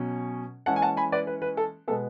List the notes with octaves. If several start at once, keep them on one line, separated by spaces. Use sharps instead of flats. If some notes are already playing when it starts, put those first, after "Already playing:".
Already playing: B2 F#3 C#4
E3 G#3 C#4 F#5 A5
G#5
F#5 A5
G#5 B5
B4 D5
B4
B4
A4
B2 G#3 B3 A4